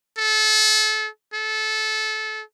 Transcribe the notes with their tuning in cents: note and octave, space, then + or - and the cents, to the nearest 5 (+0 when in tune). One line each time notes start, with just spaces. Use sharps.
A4 -30
A4 -20